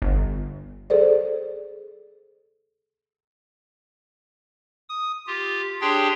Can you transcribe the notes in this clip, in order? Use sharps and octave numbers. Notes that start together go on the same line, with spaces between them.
G1
G#4 A4 C5 D5
D#6
F4 G4
D4 G4 G#4 C#5 G5 C6